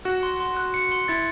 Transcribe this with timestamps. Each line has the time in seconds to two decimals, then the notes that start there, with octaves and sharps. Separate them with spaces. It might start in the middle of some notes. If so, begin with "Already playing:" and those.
0.05 F#4 F#6
0.23 C6
0.40 C6
0.57 F#6
0.74 C#7
0.92 C6
1.08 E4 A6